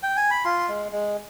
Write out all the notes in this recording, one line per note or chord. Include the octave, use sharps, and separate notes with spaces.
G5
G#5
B5
F4 C6
G#3
G#3